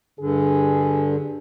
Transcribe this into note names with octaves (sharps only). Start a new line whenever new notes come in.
G2 D3 G#4